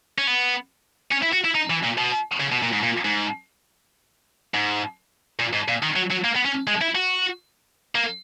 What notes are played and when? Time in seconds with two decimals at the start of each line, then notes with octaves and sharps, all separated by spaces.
0.18 C#4
0.27 B3
1.12 C#4
1.23 E4
1.33 F#4
1.45 E4
1.55 D#4
1.70 E3
1.83 A#2
1.97 B2
2.40 C#3
2.52 B2
2.62 A#2
2.73 G#2
2.83 A#2
3.04 G#2
4.54 G#2
5.39 A#2
5.53 G#2
5.68 A#2
5.83 D#3
5.96 F#3
6.11 F#3
6.24 A#3
6.36 B3
6.45 C#4
6.67 G#3
6.82 E4
6.95 F#4
7.95 A#3